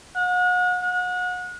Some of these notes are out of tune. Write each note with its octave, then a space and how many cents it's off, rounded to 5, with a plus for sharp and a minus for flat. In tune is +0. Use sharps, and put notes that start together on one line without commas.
F#5 -40
F#5 -35